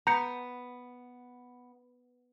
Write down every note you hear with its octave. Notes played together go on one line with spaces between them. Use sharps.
B3 A#5 G6 C#7